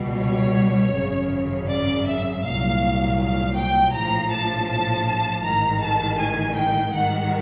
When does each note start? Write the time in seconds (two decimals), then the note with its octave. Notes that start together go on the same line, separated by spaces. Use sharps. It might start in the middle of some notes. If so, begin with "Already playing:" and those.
Already playing: C#2 B2 G3
0.20 C#5
0.95 G#1 F#2 C#3
1.69 D5
2.06 E5
2.44 C2 A#2 F#3 F5
3.18 F5
3.56 G5
3.94 A#1 A2 F3 A#5
4.31 A5
4.68 A5
5.43 A1 G#2 D#3 A#5
5.80 A5
6.19 G#5
6.56 G5
6.93 G#1 G#2 D#3 G3 F#5